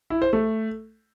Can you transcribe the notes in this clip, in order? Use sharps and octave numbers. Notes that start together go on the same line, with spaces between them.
E4
C5
A3